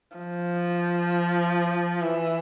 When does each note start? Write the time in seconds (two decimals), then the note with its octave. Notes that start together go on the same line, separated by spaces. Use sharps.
0.16 F3
2.02 E3